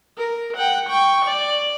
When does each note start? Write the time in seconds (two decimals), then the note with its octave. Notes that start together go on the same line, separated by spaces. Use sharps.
0.18 A#4
0.57 F#5 G5
0.88 G5 C#6
1.25 D5